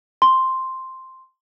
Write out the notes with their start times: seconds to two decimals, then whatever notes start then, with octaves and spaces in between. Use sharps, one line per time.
0.22 C6